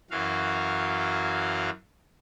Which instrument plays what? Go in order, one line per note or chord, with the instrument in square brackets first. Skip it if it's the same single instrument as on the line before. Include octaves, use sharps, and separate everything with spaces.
[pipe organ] F#2 E3 F#3 F#4 F5